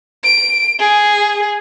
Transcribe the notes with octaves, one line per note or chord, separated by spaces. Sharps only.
D7
G#4